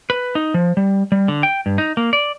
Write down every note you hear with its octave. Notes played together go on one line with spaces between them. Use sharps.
B4
D#4
F3
G3
G3
D3
G5
G2
D#4
A#3
D5